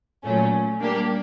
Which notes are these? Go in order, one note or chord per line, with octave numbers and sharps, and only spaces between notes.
A#2 F#3 A3 C#4
G3 A#3 D4 G4